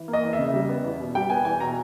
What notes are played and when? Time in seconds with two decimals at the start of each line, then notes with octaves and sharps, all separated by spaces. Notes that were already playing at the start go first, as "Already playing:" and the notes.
Already playing: E3
0.08 A#3
0.13 D#5
0.23 E2
0.33 E5
0.39 C#3
0.54 G3
0.69 B3
0.84 E2
0.99 B2
1.15 G3 G5
1.30 B3 G#5
1.45 E2 G#5
1.60 B2 A#5